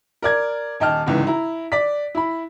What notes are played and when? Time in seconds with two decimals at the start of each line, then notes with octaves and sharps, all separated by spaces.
0.22 A#4 D5 G#6
0.80 D#1 D#5 G5 A5 F6
1.06 G1 C#2 G#2 E3
1.27 E4 A#5
1.72 D5 B6
2.15 E4 B5